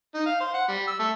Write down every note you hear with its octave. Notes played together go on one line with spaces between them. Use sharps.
D#4
F5
C5
F#5
G3
E6
A3